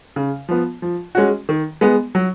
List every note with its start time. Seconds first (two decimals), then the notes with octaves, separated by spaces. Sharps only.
0.16 C#3
0.49 F3 B3
0.82 F3
1.15 G#3 C#4 F#4
1.49 D#3
1.81 G#3 B3
2.15 F#3